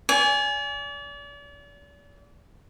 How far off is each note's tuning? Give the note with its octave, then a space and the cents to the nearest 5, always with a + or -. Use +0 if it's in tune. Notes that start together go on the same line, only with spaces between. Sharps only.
D5 -40 G#5 +0